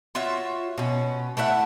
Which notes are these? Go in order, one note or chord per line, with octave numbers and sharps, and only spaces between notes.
F4 F#4 C#5 E5
B2 C#4
A3 E4 E5 F#5